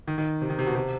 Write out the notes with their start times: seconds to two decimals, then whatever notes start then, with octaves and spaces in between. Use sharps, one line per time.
0.07 D#3
0.18 D#3
0.42 C3
0.50 D#3
0.59 C3
0.67 B2
0.75 C3